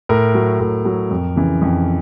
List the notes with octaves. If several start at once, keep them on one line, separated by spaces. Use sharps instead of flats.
A2 A#4
F#3
A2
F#3
F2
C#3 E3
F2